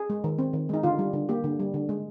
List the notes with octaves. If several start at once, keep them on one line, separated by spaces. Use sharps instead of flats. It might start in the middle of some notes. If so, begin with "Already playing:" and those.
Already playing: G#4
G#3
D#3
C4
D#3
G#3 D#4
D3 F4
G3
D3
A#3 G4
D3
G3
D3
G#3